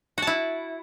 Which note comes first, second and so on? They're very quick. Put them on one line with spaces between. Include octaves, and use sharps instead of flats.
F#4 A5 E4